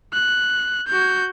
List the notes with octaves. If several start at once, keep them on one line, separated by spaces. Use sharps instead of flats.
F#6
F#4 G6